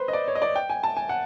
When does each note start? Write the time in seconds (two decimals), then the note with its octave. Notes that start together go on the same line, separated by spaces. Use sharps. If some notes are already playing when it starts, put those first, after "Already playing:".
Already playing: B4 C5
0.08 D#5
0.13 D5
0.28 C#5
0.35 D#5
0.42 D5
0.56 G5
0.70 G#5
0.83 A5
0.97 G#5
1.09 F#5